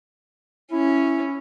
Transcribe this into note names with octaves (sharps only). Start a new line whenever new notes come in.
C#4 E4